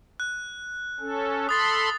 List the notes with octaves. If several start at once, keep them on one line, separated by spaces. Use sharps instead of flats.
F#6
C#4 A4
A4 B5 C6 D#6 A6 C7